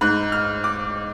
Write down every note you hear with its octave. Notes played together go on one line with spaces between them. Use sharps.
G#2 F#6
F6
D6